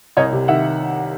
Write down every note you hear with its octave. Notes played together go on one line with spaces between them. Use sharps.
C2 C#5 D#5
C3
D#3 E5 F#5